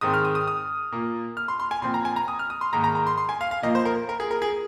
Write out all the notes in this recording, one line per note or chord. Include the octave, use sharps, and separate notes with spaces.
G#2 D#3 G#3 C4 D#6
F6
D#6
D#6
D#6
A#2 A#3
F6
C6
C6
G#5
A#2 F3 C4 C6
A#5
G#5
A#5
D#6
F6
D#6
C6
G#2 D#3 A#3 A#5
A#5
A#5
C6
C6
G#5
F5
F5
A#2 F3 A#3 D#5
C5
A#4
A#4
G#4
A#4
G#4